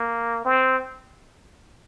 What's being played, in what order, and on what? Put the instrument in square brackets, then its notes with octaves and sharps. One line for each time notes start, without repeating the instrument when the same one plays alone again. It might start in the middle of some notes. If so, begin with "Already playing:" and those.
Already playing: [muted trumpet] A#3
C4